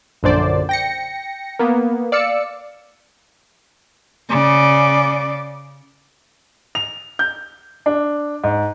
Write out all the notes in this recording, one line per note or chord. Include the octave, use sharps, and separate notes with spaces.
A#1 F#2 D3 C5 D5
G5 A#6 C#7
A#3 B3
D5 F5 E6 C#7
C#3 D5
F7
G6
D4
G#2